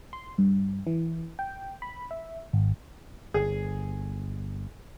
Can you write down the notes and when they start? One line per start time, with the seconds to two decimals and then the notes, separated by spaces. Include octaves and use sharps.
0.13 C6
0.38 G2
0.87 E3
1.39 G5
1.82 B5
2.11 E5
2.53 G#1
3.34 G1 G#4